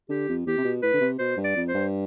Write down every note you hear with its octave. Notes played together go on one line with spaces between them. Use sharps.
D3 G4
F2
E2 G4
C3
B2
A2 B4
D3
C3
B2 C5
G2
D5
F2
C5
G2